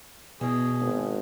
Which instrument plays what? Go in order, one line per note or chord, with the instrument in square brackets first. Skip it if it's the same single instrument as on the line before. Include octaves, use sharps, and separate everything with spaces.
[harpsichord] E2 [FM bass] B2 [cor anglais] G#4
[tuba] G#1